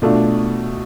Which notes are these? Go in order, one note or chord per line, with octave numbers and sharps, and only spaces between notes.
B2 A3 D4 F4